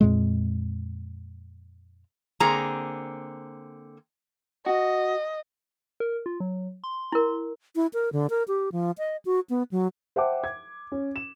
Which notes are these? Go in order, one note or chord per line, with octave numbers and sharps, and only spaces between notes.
F2 A#2 G#3
D3 A#3 C4 G#4 A#5
F#4 D#5
A#4
F4
F#3
C6
E4 A#4
E4
A#4
D3
A#4
G4
F3
D#5
F#4
B3
F#3
C5 E5 F#5 G5 A5 D6
G#6
C#4
E7